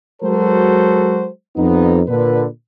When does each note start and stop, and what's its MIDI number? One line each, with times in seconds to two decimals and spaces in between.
0.22 1.27 54
0.22 1.27 56
0.22 1.27 66
0.22 1.27 69
0.22 1.27 70
0.22 1.27 72
1.57 2.01 41
1.57 2.01 59
1.57 2.01 63
2.07 2.45 46
2.07 2.45 50
2.07 2.45 71